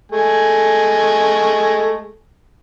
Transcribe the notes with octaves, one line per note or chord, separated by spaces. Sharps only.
G#3 A3 G#5